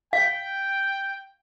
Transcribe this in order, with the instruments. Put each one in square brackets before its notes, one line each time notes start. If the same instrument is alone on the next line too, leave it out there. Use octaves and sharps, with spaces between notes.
[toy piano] F5 [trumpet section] G5